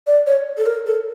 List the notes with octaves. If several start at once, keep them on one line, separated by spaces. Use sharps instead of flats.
D5
C#5
A4
A#4
A4